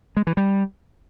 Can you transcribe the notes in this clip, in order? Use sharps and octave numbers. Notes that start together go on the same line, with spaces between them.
G#3
E3
G3